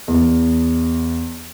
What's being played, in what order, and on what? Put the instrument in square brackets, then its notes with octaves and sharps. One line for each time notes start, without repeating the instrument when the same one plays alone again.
[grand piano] E2